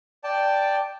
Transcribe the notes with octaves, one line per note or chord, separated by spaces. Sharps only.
D5 G5 A5